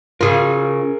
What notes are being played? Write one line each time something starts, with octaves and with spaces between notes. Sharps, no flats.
C#3 F4 G#4 A#4